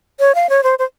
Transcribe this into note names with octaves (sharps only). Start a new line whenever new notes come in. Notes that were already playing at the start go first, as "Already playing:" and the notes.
C#5
F5
C#5
C5
C5